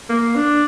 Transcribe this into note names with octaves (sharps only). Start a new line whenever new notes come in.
A#3
D4